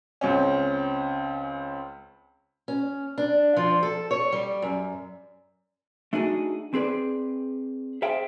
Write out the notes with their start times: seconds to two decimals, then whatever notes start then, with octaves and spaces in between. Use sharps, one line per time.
0.21 C#2 C4 C#4
2.68 C#4
3.18 D4
3.57 F3
3.83 A4
4.11 C#5
4.32 G3
4.62 F#2
6.13 A3 D4 D#4 F#4 G#4
6.74 C4 G#4 B4 D5
8.02 G#4 C5 E5 F5 G5